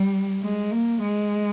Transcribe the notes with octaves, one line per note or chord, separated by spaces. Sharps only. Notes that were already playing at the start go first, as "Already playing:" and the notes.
Already playing: G3
G#3
A#3
G#3